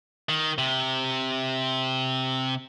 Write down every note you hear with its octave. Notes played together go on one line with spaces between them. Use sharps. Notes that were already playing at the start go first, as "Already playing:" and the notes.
D#3
C3